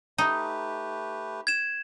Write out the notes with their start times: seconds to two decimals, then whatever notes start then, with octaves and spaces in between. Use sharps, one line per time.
0.18 A3 D#4 G4 B4
1.47 G#6 E7